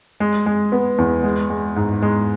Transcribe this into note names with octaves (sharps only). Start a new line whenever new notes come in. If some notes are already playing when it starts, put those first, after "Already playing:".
G#3
G#3
B3
E2
G#3
G#3
G#2
G#3